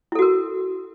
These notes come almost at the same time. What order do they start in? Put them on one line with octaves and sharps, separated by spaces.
E4 A4 F#4 A#4